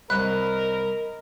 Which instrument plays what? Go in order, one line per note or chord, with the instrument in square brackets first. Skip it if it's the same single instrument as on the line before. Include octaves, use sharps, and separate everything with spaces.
[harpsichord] C2 [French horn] A#4 [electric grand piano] D#5 B5 [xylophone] F#6